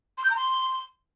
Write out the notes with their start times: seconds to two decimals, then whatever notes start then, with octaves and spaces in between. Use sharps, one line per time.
0.17 C6
0.24 G6
0.30 A#5
0.36 C6